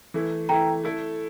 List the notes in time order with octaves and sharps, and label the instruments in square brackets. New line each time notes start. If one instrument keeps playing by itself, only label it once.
[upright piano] E3 A3 E4
[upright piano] E3 A3 E4 [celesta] G5 A#5
[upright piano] A3 E4 A4